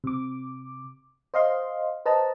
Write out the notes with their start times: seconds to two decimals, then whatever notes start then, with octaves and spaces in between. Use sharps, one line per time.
0.04 C3 D6
1.34 C5 D#5 F5 C6
2.06 B4 C5 D#5 A5 A#5